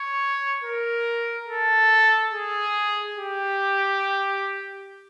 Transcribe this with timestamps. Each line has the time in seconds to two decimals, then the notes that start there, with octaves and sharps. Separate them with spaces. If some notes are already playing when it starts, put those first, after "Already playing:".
Already playing: C#5
0.64 A#4
1.48 A4
2.33 G#4
3.17 G4